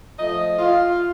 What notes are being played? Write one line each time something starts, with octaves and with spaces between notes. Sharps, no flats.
F3 A3 D#5
F4